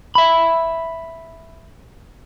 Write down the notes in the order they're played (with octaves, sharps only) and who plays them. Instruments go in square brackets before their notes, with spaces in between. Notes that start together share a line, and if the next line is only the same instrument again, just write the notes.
[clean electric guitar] E5 B5